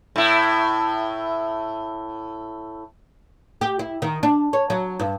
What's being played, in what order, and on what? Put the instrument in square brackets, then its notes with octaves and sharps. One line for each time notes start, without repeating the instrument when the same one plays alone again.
[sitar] A2 E4
[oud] G4
E4
D#3
D4
C#5
F#3
G2